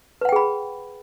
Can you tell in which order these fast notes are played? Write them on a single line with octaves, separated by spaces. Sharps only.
B4 F#5 G5 G#4 B5